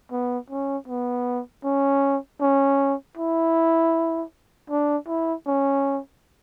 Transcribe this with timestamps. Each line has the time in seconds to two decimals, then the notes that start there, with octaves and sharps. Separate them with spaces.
0.12 B3
0.50 C#4
0.88 B3
1.64 C#4
2.41 C#4
3.17 E4
4.70 D4
5.08 E4
5.47 C#4